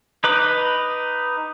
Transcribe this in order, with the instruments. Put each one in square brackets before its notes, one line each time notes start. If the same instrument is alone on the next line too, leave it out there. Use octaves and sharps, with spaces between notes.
[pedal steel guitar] D#4 B4 D6